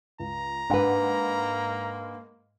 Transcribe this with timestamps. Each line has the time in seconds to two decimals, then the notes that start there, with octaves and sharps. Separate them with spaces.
0.20 C#2 A#5
0.70 G#2 A#3 D4 B4 F#5 B5